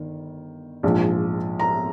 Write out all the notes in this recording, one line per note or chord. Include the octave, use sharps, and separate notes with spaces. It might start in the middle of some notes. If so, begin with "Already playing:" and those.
Already playing: G1 D#3
A#1 G#2 F3
A#5